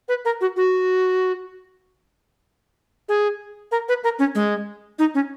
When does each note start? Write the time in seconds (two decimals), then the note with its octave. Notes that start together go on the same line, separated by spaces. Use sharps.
0.09 B4
0.25 A#4
0.41 F#4
0.56 F#4
3.09 G#4
3.72 A#4
3.89 B4
4.04 A#4
4.19 C#4
4.35 G#3
4.99 D#4
5.15 C#4